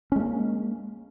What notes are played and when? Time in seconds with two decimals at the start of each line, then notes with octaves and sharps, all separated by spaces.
0.12 C#4
0.16 G#3
0.20 A#3